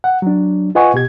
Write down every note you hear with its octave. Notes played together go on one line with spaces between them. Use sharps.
F#5
F#3 D4
F4 B4 D#5 F#5 G#5 C#6
B2 G4 G#6